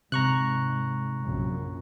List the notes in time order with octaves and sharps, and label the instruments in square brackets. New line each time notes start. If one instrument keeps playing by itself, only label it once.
[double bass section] G#2 [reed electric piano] C3 [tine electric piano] A#5 C#6 F#6
[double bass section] A#1 F#2 A#2